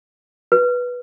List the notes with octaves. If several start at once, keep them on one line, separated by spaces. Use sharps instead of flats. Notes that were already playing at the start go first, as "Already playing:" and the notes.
B4